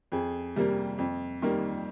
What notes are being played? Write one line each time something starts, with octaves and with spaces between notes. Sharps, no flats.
F2 G#4
C3 G3 A#3
F2
D#3 G3 A#3